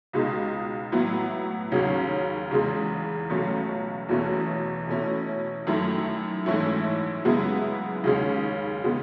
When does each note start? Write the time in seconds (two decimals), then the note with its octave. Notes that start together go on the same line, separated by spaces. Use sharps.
0.13 C#2 B2 G#3 D#4
0.92 A2 F#3 B3 E4
1.72 D#2 C#3 F#3 C#4
2.51 E2 C#3 G#3
3.30 C#2 B2 F#3 A3 C#4
4.09 E2 B2 A3 C#4 E4
4.88 B2 A3 C#4 E4
5.67 F#2 D#3 A3 E4
6.46 G#2 E3 A3 C#4 E4
7.25 F#2 C#3 G#3 B3 E4
8.04 D#2 C#3 G#3 C#4
8.84 C#3 G#3 B3